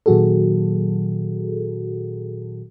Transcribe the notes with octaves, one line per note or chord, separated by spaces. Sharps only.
A#2 D#3 F#3 F#4 G#4 A4